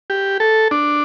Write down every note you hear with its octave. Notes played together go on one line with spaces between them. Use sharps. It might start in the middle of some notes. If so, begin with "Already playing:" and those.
G4
A4
D4